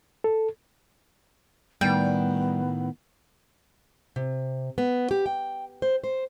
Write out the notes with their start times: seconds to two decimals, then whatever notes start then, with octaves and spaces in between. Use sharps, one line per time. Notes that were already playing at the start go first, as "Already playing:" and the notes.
0.24 A4
1.81 A2 D#3 G3 B3 G5
4.16 C3
4.78 B3
5.11 G4
5.26 G5
5.82 C5
6.04 C5